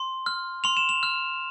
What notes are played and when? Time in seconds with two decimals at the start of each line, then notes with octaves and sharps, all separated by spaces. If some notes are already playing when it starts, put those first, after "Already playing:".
Already playing: C6
0.26 F6
0.64 C6 F7
0.77 E7
0.89 F7
1.03 F6